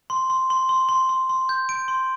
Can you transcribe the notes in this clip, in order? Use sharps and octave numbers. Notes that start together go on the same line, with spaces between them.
C6
C6
C6
C6
C6
C6
C6
G6
D7
C6